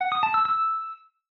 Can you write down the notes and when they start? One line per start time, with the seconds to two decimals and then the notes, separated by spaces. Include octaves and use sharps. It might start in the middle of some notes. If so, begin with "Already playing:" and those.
0.01 F#5
0.12 D#6
0.23 A5
0.34 E6
0.45 E6